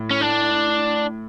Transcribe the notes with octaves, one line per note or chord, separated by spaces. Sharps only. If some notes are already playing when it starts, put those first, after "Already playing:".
Already playing: A2
C#4
D4